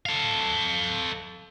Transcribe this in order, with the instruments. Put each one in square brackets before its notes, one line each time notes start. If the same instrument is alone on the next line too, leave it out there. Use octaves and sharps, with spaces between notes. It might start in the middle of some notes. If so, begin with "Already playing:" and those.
[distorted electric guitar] A4 F5